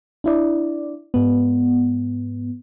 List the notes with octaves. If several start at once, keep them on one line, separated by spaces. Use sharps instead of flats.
D4 E4 D5
G#2 B3